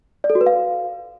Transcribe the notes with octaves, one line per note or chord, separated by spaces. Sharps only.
D5
A4
F#4
B4
F5